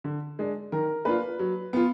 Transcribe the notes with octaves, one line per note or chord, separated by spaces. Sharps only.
D3
G#3 D4
D#3 A#4
A#3 D4 F4 B4
F#3
B3 F4